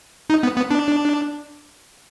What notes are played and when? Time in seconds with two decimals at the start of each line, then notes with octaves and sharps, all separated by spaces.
0.30 D#4
0.43 B3
0.57 B3
0.71 D4